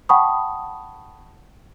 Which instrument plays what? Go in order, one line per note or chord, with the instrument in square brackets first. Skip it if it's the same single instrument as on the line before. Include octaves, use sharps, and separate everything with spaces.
[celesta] F#5 G5 A5 B5 C#6 D#6